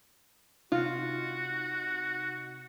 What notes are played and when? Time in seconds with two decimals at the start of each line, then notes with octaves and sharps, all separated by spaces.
0.72 C3 D#4 F4 F#4